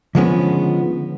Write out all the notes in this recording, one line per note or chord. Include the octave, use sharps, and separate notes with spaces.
D3 D#3 F3 G#3 B3 C#4